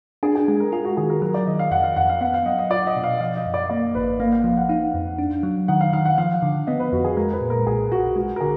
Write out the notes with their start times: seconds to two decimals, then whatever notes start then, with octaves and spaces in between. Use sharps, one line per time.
0.23 D4 G#4
0.36 G#4
0.48 G#3 G#4
0.60 A#4
0.72 F4 G#4
0.85 F#4
0.97 D#3 G#4
1.10 A#4
1.22 F#3 A#4
1.34 D5
1.47 D#3 D#5
1.59 F5
1.71 F2 F#5
1.84 F5
1.96 F2 F#5
2.09 F5
2.21 B3 F#5
2.34 F5
2.46 F#3 D#5
2.58 D#5
2.70 F4 D5
2.87 D#5
2.96 B2
3.04 F5
3.21 F3 F5
3.37 D#5
3.46 F#2
3.54 D5
3.70 A#3 D5
3.95 G#1 B4
4.20 A#3 F5
4.32 F5
4.44 F3 F5
4.57 F#5
4.69 D#4 F5
4.94 F2
5.18 D4
5.43 F#3
5.68 D#3 F#5
5.81 F5
5.93 D#3 F5
6.05 F#5
6.18 F3 F5
6.42 D3
6.67 B3 D#5
6.80 B4
6.92 F2 F#4
7.04 G#4
7.17 G#3 A#4
7.33 B4
7.41 A#2
7.50 A#4
7.67 B1 G#4
7.91 B1 F#4
8.16 G#3 F#4
8.36 A#4
8.40 D3 G#4